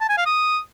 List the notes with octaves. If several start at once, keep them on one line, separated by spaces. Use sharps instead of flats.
A5
G#5
F5
D#6